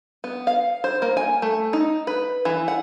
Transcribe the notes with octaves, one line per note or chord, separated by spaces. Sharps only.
B3
F5
C5
A#3
G#5
A3
D#4
B4
E3
F#5